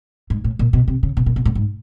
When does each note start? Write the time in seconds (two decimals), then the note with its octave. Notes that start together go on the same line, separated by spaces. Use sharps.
0.30 G#2
0.44 A2
0.59 A#2
0.73 B2
0.88 C3
1.03 C#3
1.17 B2
1.26 A#2
1.36 B2
1.45 A2
1.55 G#2